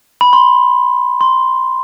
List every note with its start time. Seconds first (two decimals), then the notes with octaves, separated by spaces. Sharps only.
0.21 B5
0.33 C6
1.21 C6